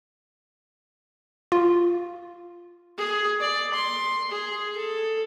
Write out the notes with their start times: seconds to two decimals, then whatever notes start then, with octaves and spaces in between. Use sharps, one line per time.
1.52 F4
2.98 G#4
3.41 D5
3.74 C6
4.31 G#4
4.77 A4